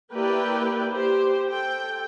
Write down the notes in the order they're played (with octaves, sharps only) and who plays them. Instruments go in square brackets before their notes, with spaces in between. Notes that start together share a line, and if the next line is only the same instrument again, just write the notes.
[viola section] A#3 E4 G4 B4 D5 G5
G4 C5
A4 G5